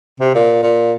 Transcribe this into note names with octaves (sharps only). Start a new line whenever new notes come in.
C3
A#2
A#2